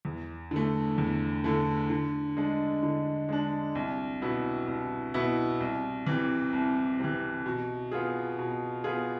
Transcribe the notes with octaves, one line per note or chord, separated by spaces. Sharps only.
E2
D3 A3
E2
D3 A3
D3
G#3 D4
D3
G#3 D4
C2
B2 B3 E4
C2
B2 B3 E4
C2
C3 E3
C2
C3 E3
B2
B3 F4 G#4
B2
B3 F4 G#4